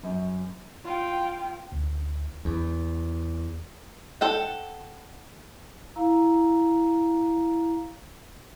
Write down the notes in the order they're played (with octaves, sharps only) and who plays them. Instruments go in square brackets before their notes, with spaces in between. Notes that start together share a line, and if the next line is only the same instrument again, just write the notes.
[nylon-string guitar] F#2
[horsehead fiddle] F4 G5
[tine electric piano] D2
[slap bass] E2
[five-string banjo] A4 F#5 G5
[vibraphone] E4 F5 A#5